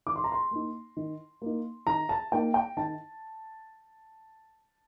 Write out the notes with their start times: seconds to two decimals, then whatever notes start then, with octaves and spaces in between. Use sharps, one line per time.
0.06 D#3 D6
0.16 C6
0.24 A#5
0.32 C6
0.51 A#3 D#4
0.97 D#3
1.42 A#3 D#4
1.87 D#3 A#5
2.09 A5
2.32 A#3 D#4 G5
2.54 G5
2.77 D#3 A5